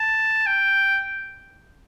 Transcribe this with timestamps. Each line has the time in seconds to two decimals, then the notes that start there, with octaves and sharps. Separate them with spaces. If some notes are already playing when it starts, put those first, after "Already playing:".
Already playing: A5
0.47 G5